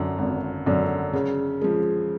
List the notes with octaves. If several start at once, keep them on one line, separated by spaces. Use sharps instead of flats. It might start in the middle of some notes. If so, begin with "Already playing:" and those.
Already playing: F#2 D3
G#1
F#2 D3
C#3
F3 G#3